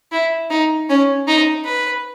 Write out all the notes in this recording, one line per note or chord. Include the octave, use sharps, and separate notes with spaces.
E4
D#4
C#4
D#4
B4